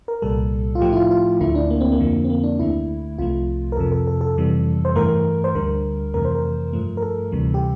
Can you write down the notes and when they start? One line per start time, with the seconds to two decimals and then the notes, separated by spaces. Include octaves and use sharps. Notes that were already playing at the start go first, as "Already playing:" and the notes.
0.08 A#4
0.22 C2 A#2 G3 A4
0.75 F4
0.81 A2 F3 A3 G4
0.93 E4
0.96 F4
1.11 F4
1.41 D2 D3 A3 E4
1.55 D4
1.70 A#3
1.81 C4
1.92 A#3
2.00 F2 D3 F3
2.24 C4
2.30 A#3
2.43 D4
2.59 D2 D3 A3 E4
3.18 C2 C3 F3 A3 F4
3.72 A#4
3.77 F2 C3 F3 A4
3.92 A4
4.07 A4
4.21 A4
4.37 F2 C3 E3 G3
4.85 C5
4.95 G2 E3 A3 A#4
5.44 C5
5.55 D2 D3 G3 A#4
6.14 F2 C3 E3 A3 A#4
6.25 C5
6.35 A#4
6.73 G2 F3 A3
6.97 A#4
7.02 A4
7.32 D2 C3 E3 G3
7.54 G4